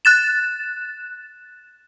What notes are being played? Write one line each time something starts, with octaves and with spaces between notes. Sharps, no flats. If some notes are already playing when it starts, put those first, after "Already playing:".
F#6 A6 E7